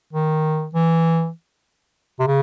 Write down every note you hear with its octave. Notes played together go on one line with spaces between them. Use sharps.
D#3
E3
C3
C#3